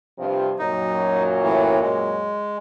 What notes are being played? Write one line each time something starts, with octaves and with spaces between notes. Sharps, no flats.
G2 C3 F3
F#2 A#2 F#3 D#4
A2 E3
G#3